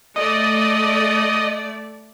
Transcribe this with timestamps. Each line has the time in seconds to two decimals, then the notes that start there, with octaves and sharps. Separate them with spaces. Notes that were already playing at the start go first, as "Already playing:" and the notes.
0.16 A3 D5 D#5